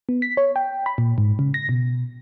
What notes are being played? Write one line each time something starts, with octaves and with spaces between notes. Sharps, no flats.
B3
B6
C#5
G5
B5
A#2
G#2
C#3
A#6
B2